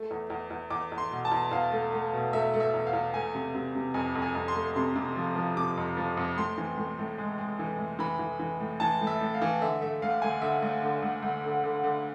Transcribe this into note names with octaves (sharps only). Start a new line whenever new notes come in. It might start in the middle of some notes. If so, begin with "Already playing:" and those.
Already playing: A3
E2
E2
E2
E2 D6
E2
C6
B2
A5
E2
E2 F5
A3
A3
B2
A3 E5
A3
E5
E2
F5
E2
A3 G#5
C3
C3
C3
F2 G#5
F2
G#5
F2
C6
A3
C3 C6
C3
F3
F3
C3 D6
F2
F3
F2
A2 C6
E3
A2
A2
G#3
G#3
E3
A2
E3 B5
E3
E3
A2
E3 A5
A2
E5
A2
F5
E3
D3 E5
A3 E5
D2 F5
D2 G#5
D3 E5
D2
D3
D2
D2
D3
D3
D3